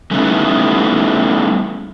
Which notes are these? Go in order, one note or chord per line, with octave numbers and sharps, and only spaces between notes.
G3 A3 B3 C#4 D#4 E4